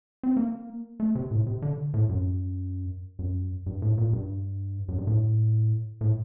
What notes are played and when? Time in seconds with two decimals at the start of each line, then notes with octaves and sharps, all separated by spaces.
0.23 C4
0.37 A#3
1.00 A3
1.15 C3
1.31 A2
1.47 C3
1.62 D3
1.94 A2
2.09 F#2
3.19 F#2
3.66 G2
3.82 A2
3.98 A#2
4.13 G2
4.89 F#2
4.98 G2
5.07 A2
6.01 A2